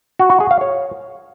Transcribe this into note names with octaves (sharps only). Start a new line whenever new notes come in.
F#4
F#4
G#4
F5
C#5